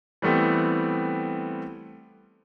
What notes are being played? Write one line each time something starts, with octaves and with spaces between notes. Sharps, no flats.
E3 G3 A3 B3 C4